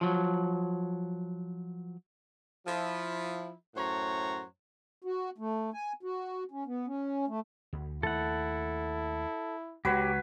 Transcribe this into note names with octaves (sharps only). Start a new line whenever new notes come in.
F3 F#3
F3 E4
F#2 A2 C5 C#5 F#5 A#5
F#4
A3
G#5
F#4
C#4
B3
C#4
A3
D2
D#2 A3 E4 A4 F#5
C#2 C#3 F#3 G4 B4 C#5